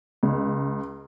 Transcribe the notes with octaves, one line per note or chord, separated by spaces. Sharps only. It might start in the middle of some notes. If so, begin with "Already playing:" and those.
C#2